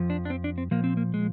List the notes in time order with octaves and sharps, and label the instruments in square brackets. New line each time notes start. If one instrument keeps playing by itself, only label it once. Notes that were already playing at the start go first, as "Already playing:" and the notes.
Already playing: [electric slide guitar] F2 F3
D4
D4
C4
D4
C4
A#2 F3 A#3
C4
A#3
G#3